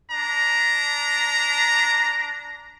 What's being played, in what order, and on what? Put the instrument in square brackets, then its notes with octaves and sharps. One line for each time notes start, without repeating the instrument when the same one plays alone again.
[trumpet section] D4 A#5